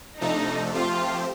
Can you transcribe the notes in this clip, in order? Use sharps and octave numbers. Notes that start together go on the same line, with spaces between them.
C3 F3 A3 D4 D#4 A4
F3 A3 C4 F4 G4 C5